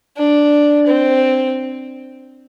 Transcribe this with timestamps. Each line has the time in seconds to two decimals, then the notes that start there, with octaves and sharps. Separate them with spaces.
0.17 D4
0.87 C4